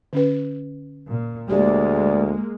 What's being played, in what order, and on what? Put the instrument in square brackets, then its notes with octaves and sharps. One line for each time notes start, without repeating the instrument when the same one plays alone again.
[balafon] D3 C#4 B4
[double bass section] A#2
[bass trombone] D2 [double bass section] G#3 A#3 [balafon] G4 [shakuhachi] D5